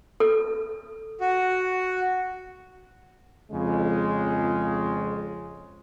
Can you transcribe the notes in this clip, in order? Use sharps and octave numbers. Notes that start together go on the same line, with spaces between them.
A4
F#4
F2 C#3 G#3